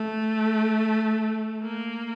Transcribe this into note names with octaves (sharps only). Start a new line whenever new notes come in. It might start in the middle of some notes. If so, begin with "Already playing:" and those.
Already playing: A3
A#3